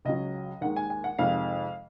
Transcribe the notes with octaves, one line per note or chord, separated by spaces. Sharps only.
C#2 C#3 F#3 D#5
D#2 D#3 G#3 F#5
G#5
G#5
F#5
F2 C3 D#3 G#3 F5